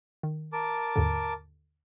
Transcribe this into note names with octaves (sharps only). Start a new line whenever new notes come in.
D#3
A#4 A5 D6
D#2 G#2 D3